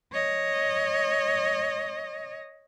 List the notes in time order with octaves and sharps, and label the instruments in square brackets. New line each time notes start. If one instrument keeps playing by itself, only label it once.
[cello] C#5 D#5